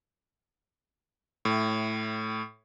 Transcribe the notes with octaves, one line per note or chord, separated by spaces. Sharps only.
A2